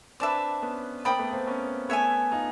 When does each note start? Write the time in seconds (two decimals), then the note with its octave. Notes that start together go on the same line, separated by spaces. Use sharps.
0.20 C4 D4 B4 E5 A5 D6
0.62 B3 C#4
1.05 A#3 C4 D5 G5 B5 D#6
1.18 A3 B3
1.33 A#3 C4
1.47 B3 C#4
1.89 A3 B3 C#5 E5 G#5
2.32 D#4 F4